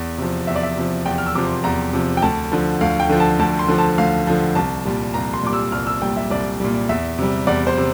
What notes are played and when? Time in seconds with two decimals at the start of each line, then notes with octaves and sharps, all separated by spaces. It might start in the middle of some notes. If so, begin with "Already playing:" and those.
Already playing: E2
0.18 C3 F3
0.47 E2 E5
0.55 D5
0.63 E5
0.77 C3 F3
1.06 E2 G5
1.18 F6
1.26 E6
1.35 C3 F3 D6
1.45 C6
1.64 E2 A#5
1.93 C3 F3
2.17 G5
2.22 D2 A5
2.52 D3 F3
2.81 D2 F5
3.00 G5
3.09 D3 F3
3.20 A5
3.39 D2 A5
3.59 C6
3.68 D3 F3
3.78 A5
3.98 D2 F5
4.27 D3 F3
4.55 C2 A5
4.85 A#2 G3
5.14 C2 A#5
5.34 C6
5.43 A#2 G3 D6
5.53 E6
5.72 C2 F6
5.87 E6
6.02 A#2 G3 G5
6.17 E5
6.30 C2 D5
6.60 A#2 G3
6.89 E2 E5
7.19 C3 G3
7.47 E2 D5
7.67 C5
7.77 C3